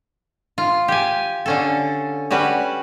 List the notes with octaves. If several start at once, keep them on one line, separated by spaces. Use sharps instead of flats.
F4
G4 G#5
D3 C#4 A4
G3 C#4 F#4 B4